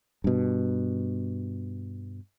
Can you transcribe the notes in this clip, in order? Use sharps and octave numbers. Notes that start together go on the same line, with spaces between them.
G2 B2